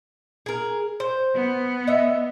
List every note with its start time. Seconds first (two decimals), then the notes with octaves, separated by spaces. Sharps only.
0.46 G#4 A#4
1.00 C5
1.35 B3
1.87 D#5 E5